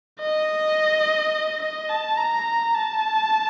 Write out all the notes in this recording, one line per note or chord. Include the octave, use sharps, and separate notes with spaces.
D#5
D#5
A5
A#5
A5